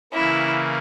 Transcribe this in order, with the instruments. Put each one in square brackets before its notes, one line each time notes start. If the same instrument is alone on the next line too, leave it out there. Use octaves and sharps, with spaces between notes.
[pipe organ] C#3 E3 A#3 [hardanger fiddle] E4